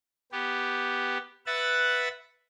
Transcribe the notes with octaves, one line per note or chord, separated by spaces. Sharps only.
B3 G4
B4 E5 F#5 A6